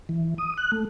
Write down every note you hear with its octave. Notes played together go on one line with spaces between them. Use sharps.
E3
D#6
F#6
A3